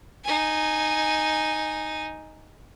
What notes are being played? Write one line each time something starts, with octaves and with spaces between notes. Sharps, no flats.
D#4 G#5